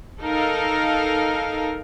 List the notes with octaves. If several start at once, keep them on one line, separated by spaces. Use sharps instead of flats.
D#4 A4 A#4 F5